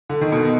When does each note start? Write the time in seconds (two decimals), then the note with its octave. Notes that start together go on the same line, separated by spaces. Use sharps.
0.09 D3
0.21 D#3
0.32 B2